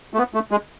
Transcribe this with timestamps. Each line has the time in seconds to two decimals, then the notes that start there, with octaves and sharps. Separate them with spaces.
0.14 A3
0.18 B3
0.34 A3
0.51 G#3